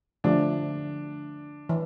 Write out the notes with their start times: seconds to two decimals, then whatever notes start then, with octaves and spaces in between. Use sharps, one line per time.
0.24 D3 F3 A3 D4
1.69 E3